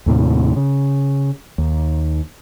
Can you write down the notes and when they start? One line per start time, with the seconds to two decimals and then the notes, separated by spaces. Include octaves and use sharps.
0.06 D#2 A2 C3
0.56 C#3
1.58 D#2